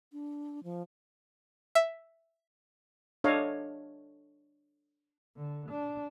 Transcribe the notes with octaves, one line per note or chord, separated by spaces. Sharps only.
D4
F3
E5
D4 A4 C#5 D#5 F5
D3
D4